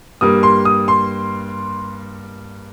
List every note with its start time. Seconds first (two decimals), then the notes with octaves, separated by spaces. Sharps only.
0.21 G2 G3 A#3 D#6
0.43 C6
0.65 D#6
0.88 C6